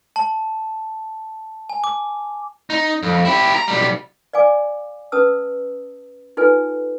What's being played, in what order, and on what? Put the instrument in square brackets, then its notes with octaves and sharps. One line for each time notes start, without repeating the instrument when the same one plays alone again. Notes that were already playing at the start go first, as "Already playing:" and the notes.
[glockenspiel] A5
G#5
D6
[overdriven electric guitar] D#4
F2
E4 G4
A#5
B1 G3
[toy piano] D5 F5 G#5 D6
C#4 B4 A5 D#6 E6
D#4 F4 A4 B4 G#5